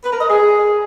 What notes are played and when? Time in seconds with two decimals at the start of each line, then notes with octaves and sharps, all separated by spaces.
0.05 B4
0.13 A#4
0.21 D#5
0.29 G#4